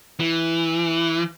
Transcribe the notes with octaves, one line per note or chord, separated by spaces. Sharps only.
E3